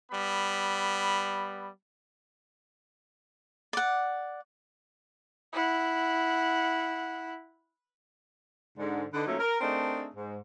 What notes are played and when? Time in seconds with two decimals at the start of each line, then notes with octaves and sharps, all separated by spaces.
0.12 G3 B3 B5
3.73 D5 F#5
5.53 E4 F#5
8.78 G#2 D3
9.14 D3 D#4 B4
9.27 A#2 F#3 A3 C#4 D#4 A4
9.39 A#4
9.61 A3 C4 D4 D#4 G#4 A#4
10.14 G#2